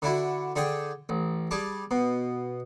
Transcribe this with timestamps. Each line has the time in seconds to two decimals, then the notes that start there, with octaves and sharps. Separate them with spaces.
0.02 D3 D4 E4 F#4
0.56 D3 D4 G#4 G5
1.09 A1
1.51 G3 G#4 A5 D6
1.91 B2